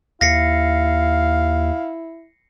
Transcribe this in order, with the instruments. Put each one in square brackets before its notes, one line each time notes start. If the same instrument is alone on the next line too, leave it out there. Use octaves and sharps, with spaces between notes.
[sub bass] D#2 [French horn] E4 [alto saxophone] F5 [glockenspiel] A#6 C7 C#7